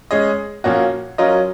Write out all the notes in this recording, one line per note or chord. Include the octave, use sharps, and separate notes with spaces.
G#3 C#4 G#4 D#5
A#2 F3 A#3 C#4 F#4
F#3 C#4 F4 A#4 D#5